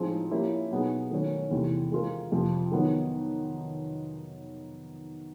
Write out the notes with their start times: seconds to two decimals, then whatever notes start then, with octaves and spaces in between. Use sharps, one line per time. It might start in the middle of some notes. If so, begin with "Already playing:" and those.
Already playing: A2 F3 G#3 C4 D#4
0.31 F3 A#3 C#4 E4 G4
0.71 B2 F#3 B3 D#4 G#4
1.11 D#3 F#3 A3 C#4
1.51 E2 C3 E3 A3
1.91 G#3 C4 F4 A#4
2.32 F2 C3 F3
2.72 D#3 F#3 B3 D#4